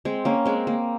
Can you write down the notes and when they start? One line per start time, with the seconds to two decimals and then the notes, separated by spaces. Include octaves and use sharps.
0.05 G#3 C4
0.25 A#3 C#4
0.46 G#3 C4
0.67 A#3